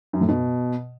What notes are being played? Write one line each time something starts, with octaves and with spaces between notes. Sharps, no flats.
F#2
A2
B2